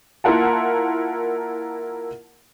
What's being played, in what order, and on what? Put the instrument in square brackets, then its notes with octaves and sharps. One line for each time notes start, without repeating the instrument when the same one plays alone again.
[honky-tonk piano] A#3 E4 F4 A#4 F#5 A5